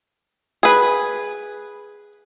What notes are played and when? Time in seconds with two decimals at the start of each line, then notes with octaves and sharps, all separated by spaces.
0.63 G#4 B4